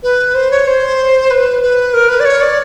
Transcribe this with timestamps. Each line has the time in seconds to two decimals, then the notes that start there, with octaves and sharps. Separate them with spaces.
0.03 B4
0.34 C5
0.51 C#5
0.67 C5
1.30 B4
1.62 B4
1.94 A#4
2.09 B4
2.20 D5
2.25 C#5
2.41 D5